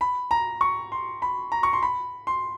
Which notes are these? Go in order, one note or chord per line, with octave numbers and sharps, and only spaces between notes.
B5
A#5
C#6
C6
B5
A#5
C#6
C6
B5
C6